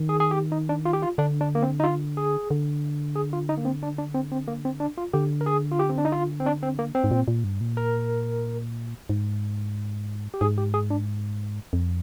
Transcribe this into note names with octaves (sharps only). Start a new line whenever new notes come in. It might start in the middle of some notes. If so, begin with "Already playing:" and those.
Already playing: D#3
G#4
G#4
G4
D#4
D4
F4
G4
F4
D3 D4
D4
A#3
C4
D#4
F4
G#4
D3
G#4
F4
D#4
A#3
C4
D4
D4
C4
C4
A#3
C4
D4
F4
D3 G4
A#4
G#4
F4
G4
C4
D4
D#4
F4
C4
D4
C4
A#3
C4
G#2
A#2
A#2
G2
A#2
A#4
G#2
G4
G#2 G#4
G4
G#4
D4
F2